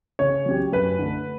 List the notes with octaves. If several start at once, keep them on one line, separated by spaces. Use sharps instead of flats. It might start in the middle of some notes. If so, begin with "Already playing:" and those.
C#3 C#5
F#3 C#4 G4
F#2 B4
D3 A3